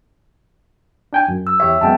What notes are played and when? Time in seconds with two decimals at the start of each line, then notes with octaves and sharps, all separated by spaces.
1.13 D4 G5 G#5
1.28 F#2
1.47 E6
1.60 E2 G4 C#5 E5
1.81 F#2 G#3 B3 G5 A5